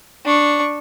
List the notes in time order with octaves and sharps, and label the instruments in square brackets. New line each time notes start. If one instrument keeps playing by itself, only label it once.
[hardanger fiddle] D4 C#6